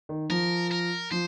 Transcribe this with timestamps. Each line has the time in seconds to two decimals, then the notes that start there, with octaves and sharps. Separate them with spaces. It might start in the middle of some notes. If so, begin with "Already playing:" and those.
0.09 D#3
0.30 F3 A#4
0.71 A#4
1.11 F3 C5